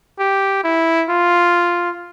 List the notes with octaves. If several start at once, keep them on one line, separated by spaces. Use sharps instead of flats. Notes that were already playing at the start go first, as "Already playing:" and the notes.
G4
E4
F4